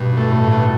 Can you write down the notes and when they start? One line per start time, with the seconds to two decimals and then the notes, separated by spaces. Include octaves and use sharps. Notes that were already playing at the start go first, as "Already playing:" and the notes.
Already playing: G2 B2
0.17 A3
0.30 A2
0.44 G2
0.51 B2